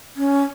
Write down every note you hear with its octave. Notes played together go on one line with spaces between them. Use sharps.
C#4